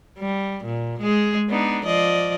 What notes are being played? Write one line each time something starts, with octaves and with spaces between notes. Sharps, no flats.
G3
A#2
G#3 G#4
B3 D4 D#4
F3 D5 D#5